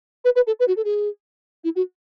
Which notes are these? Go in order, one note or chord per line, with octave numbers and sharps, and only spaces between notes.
B4
B4
A4
B4
F#4
A4
G#4
E4
F#4